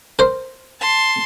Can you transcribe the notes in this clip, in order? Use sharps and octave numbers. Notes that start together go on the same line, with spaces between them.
A#4 C5
A5 C6